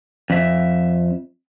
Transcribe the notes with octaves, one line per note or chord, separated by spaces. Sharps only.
F2 E5